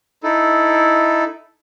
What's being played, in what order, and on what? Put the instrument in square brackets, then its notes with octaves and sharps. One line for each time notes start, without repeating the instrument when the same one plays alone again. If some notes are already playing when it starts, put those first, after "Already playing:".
[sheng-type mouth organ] D#4 E4 A4